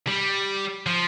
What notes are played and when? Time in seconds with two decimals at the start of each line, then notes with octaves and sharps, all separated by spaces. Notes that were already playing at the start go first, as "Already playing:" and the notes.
0.07 G3
0.86 F3